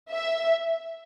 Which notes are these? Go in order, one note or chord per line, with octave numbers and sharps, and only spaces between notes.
E5